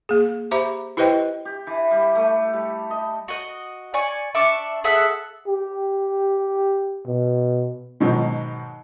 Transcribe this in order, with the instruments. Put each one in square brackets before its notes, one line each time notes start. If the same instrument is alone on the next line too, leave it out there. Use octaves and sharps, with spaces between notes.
[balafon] A#3 G#4
G4 C5 E5 A#5 B5 D6
E4 G4 B4 C5 D#5 G5
[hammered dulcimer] G4
E3
G3
A3
G3
D#5
[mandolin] F#4 D#5
D5 G#5 C#6
D4 E5 C#6 D6
G#4 A4 E5 F#5
[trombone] G4
B2
[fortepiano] G#2 B2 D#3 F#3